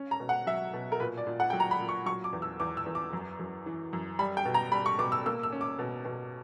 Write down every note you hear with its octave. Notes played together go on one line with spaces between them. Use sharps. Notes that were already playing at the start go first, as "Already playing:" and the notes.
Already playing: C#4
A#5
B2
F#5
F#3 E5
B2
A#4
A#2 B4
D5
A#2
F#5
F#3 G5
A#5
B5
A#2
C#6
F#3 C#6
D6
E2
E6
E2 D6
E6
E2
D6
F#2
F#2
E3
F#2
G3 B5
G5
B2
A#5
G3 B5
C#6
B2 D6
E6
A#3 E6
E6
C#4
D6
B2
B2